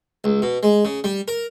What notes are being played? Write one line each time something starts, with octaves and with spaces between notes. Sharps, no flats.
C#2
B2
G#3
C#3
G3
A#4